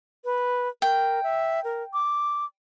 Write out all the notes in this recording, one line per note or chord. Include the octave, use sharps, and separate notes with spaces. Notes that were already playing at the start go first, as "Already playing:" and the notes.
B4
A#4 G5
E5
A#4
D6